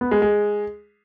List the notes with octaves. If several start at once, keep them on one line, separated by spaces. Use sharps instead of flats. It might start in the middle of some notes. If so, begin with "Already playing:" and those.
B3
G#3
G#3